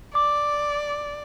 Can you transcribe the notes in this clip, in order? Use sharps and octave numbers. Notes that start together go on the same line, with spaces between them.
D5 D6